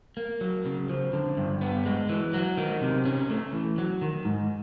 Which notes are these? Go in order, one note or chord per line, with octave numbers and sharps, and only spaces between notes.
A#3
F#3
C#3
F3
D3
G2
B3
G#3
E3
F#3
D#3
C3
C#4
A3
E3
F#3
D#3
G#2